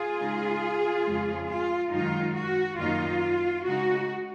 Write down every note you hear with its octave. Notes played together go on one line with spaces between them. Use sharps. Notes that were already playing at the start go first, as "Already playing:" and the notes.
Already playing: F4 G#4
C#3 G#3 D#4
F2 C#3 F3 G#3
F4
F#2 D#3 G#3 D#4 F4
F#4
F#2 D#3 A#3 D#4 F4
C#3 G#3 D#4 F#4